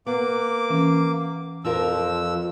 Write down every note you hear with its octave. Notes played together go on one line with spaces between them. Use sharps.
A#3 B3 D6
E3 C#4
F2 F3 F4 A#4 E6